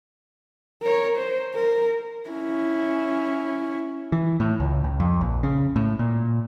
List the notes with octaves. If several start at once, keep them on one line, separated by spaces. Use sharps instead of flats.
A#4 C#5
C5
A#4
C#4 E4
E3
A2
C#2
C#2
F2
A#1
C#3
A2
A#2